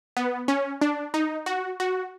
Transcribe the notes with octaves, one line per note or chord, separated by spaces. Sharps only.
B3
C#4
D4
D#4
F#4
F#4